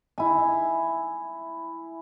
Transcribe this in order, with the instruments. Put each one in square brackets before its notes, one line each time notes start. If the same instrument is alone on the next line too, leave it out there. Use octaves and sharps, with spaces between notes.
[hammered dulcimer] E4 G#5